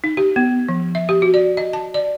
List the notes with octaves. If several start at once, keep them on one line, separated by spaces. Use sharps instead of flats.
D#4
G4
B3
F3
E5
G4
F#4
D5
D#5
A5
D5